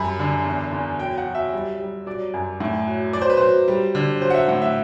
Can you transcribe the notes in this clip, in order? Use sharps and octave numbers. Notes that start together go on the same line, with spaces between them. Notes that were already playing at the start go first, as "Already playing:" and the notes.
Already playing: F#2 G3 B5
D3
E2
E2
F#3 G5
F#5
F#3
E5
G3
G3
F#3 D5
F#2
A2
F#3
F#3 D5
C5
B4
F#3 C5
G3
D3
F#3 C5
F#5
E5
A2 F#5
E5